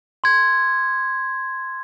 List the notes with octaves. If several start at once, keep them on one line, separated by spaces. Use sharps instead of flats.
C6 G#6